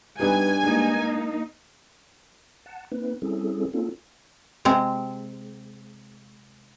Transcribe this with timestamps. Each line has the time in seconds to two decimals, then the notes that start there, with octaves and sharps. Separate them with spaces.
0.20 G2 G3 B3 D#4 G#5
0.63 G#3 A#3 D#4
2.66 F#5 A5
2.92 A#3 C4 D#4 B4
3.22 G3 C4 C#4 E4 G#4 A4
3.73 A#3 C4 C#4 D#4 F4 A4
4.65 C3 G#3 C4